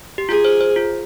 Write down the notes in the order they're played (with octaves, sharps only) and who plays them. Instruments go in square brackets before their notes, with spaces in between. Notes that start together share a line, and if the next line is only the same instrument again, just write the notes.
[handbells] G4
[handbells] F4 [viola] G#4
[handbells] C5
C5
F4